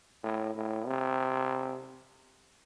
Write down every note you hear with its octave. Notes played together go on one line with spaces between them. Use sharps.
A2
A2
C3